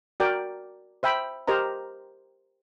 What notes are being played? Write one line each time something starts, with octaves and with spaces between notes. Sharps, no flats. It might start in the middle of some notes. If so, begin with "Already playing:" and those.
F#4 A#4 D5 G5
C5 E5 G5 B5
G4 A#4 C5 D#5 A#5